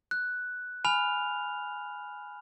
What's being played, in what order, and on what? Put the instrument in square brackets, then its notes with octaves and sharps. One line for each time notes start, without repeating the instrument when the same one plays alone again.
[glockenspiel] F#6
G#5 B5 F6 F7